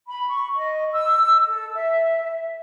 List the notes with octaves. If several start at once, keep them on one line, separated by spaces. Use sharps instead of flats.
B5
C#6
D#5
E6
A4
E5